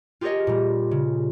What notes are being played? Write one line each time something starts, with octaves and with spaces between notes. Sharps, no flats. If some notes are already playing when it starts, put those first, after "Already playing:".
F4 G4 G#4 A#4 C#5 D#5
A#2 G3
C#3